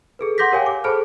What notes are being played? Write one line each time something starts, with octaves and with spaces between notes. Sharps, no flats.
G#4 A4 B4
F#5 C6 D6 G6 A#6 B6
G4 A#4 C#5 F5 G5 G#5
D6
G#4 A4 C5 A5 B5 F6